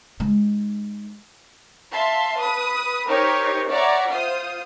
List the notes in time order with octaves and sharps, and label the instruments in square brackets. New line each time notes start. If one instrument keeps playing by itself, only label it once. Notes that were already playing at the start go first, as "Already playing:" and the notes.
[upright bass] G#3 D#4
[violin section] E5 F5 A5 C6
B4 D#6
D#4 G4 A#4 C5 C#5
C#5 D5 E5 F#5 A#5
F4 C5 D#6